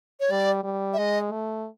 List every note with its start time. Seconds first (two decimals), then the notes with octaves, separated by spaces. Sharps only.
0.20 C#5
0.31 G3 D5
0.64 G3
0.93 E5
0.98 G#3 D#5
1.32 A3